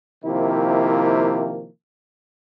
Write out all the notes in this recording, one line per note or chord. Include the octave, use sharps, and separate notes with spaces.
C3 D#3 F3 A#3 E4